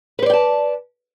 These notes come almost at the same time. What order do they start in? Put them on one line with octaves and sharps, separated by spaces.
B4 C5 D5 G5 A5